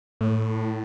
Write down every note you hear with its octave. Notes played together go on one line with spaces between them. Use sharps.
A2